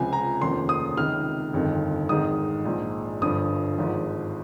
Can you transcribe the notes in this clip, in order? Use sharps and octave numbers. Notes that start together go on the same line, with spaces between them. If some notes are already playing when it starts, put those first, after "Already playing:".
Already playing: C#2 C3 F3 G#5
A#5
F1 D#2 C#3 F3 C6
D#6
C#2 C3 D#3 F6
G1 F2 D#3
G#1 G#2 D#3 D#6
A#1 G#2 F3
G1 G2 F3 D#6
G#1 G#2 F3